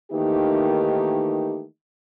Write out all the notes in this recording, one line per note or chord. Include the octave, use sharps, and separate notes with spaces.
D#3 E3 A3 A#3 D#4 G4